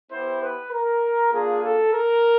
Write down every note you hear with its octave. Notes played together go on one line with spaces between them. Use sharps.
B3 E4 G4 C5
B4
A#4
A#3 D4 F4 G#4
A4
A#4